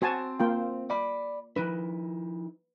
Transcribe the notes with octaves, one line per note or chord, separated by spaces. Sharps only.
C4 F#4 C5 G#5 A5
A#3 F4 G5
D5 B5
F3 D#4 E4 B4